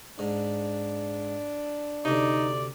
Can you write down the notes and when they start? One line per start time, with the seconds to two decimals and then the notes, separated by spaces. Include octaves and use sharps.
0.19 G#2 D4
2.05 D2 C3 D#4 D5